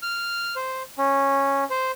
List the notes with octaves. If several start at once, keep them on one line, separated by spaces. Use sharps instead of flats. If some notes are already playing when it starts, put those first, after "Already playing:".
F6
C5
C#4
C5